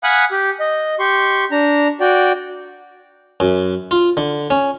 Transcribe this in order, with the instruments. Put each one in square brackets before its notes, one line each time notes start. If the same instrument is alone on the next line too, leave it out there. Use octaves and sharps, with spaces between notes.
[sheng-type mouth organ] F5 F#5 G#5 B5 D#6 F#6
G4
D#5
G4 C6 C#6
D4 A#5
F#4 D5 G5
[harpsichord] F#2
F4
D3
C#4